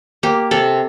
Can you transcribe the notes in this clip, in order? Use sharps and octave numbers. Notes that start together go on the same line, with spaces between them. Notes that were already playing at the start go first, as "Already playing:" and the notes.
A#3 G4
C3 A4